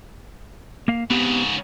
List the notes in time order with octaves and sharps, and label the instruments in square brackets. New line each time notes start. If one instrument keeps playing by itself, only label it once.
[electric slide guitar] A#3 F5
[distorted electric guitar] G#2 C#3 [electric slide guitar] B3 C4 G4